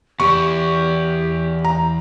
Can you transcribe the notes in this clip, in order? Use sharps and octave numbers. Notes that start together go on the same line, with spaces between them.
E2 G4 C#6
A#5